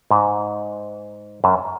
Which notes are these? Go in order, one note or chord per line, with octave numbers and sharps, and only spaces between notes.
G#2
F#2